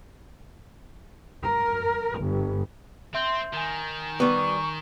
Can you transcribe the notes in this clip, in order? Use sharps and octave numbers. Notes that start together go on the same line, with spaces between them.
A#4
G1
C4 E5 C6 G6
D#3 G#5 G6
G3 B3 C#6